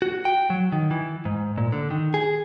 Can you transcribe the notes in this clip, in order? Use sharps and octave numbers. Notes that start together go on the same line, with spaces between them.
F#4
G5
F#3
D#3
E3
G#2
A#2
D3
D#3
G#4